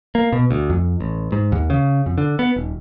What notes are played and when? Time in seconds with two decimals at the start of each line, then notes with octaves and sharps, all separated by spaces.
0.15 A#3
0.33 B2
0.51 D2
0.70 F2
1.01 A1
1.32 G#2
1.52 D#2
1.70 C#3
2.06 F2
2.18 D3
2.39 B3
2.56 D#1